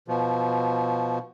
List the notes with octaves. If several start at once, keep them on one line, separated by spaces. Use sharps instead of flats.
B2 F3